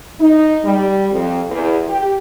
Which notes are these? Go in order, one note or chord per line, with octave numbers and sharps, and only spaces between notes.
D#4
G3
F2
E2
G4